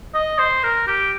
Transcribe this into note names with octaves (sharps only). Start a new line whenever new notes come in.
D#5
C5
A#4
G4